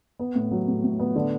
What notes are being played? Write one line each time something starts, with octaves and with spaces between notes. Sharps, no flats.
B3
A2
F#3
A2
A2
B3
D3